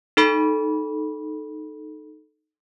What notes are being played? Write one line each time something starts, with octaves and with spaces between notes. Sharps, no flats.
D#4 A4 B5